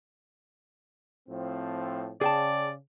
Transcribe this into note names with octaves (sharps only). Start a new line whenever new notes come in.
A2 F3 C4
C#3 G#4 D5 G5 A5